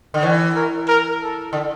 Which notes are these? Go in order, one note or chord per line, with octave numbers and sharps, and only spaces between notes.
D3
E3 C#5
A#4
A#4
A4
D3